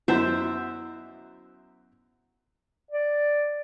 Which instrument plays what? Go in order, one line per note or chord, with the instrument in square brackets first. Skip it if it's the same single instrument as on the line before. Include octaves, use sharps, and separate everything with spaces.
[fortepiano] F#2 B2 [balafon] E4 [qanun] C5 E5
[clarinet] D5